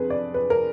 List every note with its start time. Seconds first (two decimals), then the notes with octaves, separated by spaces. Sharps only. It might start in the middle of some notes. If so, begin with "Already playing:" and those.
Already playing: F2 G#4 B4
0.10 D5
0.34 B4
0.50 A#4